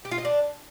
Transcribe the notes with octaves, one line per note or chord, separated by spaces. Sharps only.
G4
F4
D#5
D4